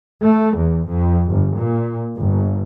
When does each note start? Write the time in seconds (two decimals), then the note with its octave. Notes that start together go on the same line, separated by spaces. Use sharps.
0.24 A3
0.58 E2
0.88 F2
1.30 G1
1.59 A#2
2.19 G1